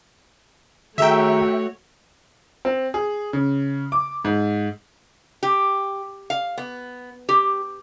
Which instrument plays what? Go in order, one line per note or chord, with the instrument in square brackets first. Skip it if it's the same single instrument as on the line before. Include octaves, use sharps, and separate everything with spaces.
[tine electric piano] D#3 G#4 A#5 [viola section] A3 F#4 C#5 [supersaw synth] E5 G5
[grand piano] C4
G#4
C#3
D6
G#2
[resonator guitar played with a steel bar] G4
F5
B3
G4